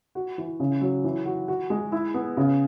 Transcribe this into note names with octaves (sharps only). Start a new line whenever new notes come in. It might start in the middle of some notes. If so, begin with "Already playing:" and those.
F#4
E3
C#3
F#3
E3
F#4
F#4
G#3
E4
B3
C#3